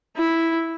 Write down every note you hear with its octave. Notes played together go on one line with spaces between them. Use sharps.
E4